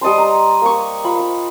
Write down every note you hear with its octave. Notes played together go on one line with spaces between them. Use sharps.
G3 D#5 A5 C6
A#5
A#3 C#6
F4 B5
F5